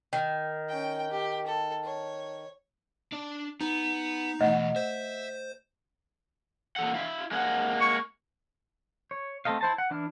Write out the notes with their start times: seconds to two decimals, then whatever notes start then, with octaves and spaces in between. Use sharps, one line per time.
0.13 D#3
0.69 C#4 G5
1.10 G4
1.47 A4
1.83 C#5
3.12 D4 D5
3.61 B3 D#4
4.41 B2 E3 A3 D#5 F#5
4.76 C5 E5
6.76 A#2 A4 F#5
6.94 E4 E5 F5
7.31 G#3 A#3 F#5
7.80 C#6
9.11 C#5
9.45 A3 C4 A4 D#5 F5
9.61 E4 C5 A5
9.78 F#5
9.91 E3 D4 E4 F6